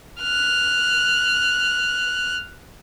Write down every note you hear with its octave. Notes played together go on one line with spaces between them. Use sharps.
F6 F#6